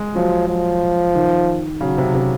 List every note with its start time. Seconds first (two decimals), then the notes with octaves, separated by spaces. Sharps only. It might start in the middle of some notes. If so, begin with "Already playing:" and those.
Already playing: G#3
0.15 F3 F#3
0.48 F3
1.15 D#3
1.81 C#3 F#3
1.98 C3
2.15 C3